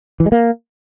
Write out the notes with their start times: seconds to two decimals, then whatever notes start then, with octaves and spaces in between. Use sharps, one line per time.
0.20 E3
0.26 G#3
0.32 A#3